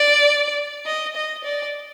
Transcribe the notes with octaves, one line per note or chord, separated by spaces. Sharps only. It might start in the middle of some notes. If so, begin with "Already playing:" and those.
Already playing: D5
D#5
D#5
D5